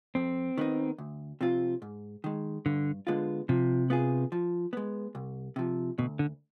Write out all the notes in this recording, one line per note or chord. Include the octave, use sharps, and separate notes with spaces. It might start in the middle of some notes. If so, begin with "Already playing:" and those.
F2 C4
D#3 B3 D#4
D2
C3 F3 C4 F4
G#2
D#3 G#3
G2 D3
D3 G#3 B3 F4
C3 F3
B3 F4 G#4
F3
G#3 B3
C2
C3 F3
D2 B2
D3